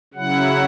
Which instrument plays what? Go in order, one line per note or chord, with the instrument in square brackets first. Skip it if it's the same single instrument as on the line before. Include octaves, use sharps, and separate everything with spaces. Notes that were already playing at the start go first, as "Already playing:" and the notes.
[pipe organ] C#3 F#3 E4 F#5